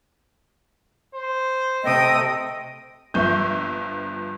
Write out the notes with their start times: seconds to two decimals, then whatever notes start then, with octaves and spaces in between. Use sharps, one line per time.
1.15 C5
1.84 C3 A3 D#5 G5 D#6 E6
3.14 G1 G2 F3 E5 C#6 G6